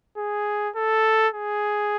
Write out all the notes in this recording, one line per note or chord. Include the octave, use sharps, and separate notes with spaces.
G#4
A4
G#4